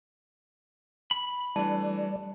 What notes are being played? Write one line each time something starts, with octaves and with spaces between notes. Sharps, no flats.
B5
E3 G3 A3 D4 D5 A5